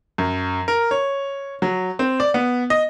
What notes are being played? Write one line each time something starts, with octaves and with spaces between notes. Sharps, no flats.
F#2
A#4
C#5
F#3
C4
D5
B3
D#5